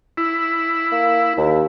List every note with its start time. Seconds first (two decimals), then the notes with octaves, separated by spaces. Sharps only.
0.17 E4
0.92 A#3
1.38 D#2